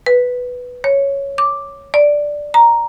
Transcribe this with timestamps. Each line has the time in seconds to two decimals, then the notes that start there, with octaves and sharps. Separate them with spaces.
0.06 B4
0.84 C#5
1.38 D6
1.94 D5
2.54 A#5